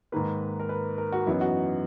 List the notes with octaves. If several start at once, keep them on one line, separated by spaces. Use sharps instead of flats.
G#2 D#3 A#3 B4
A#4
B4
A#4
F#4
F#2 E3 B3 D#4 E4
F#4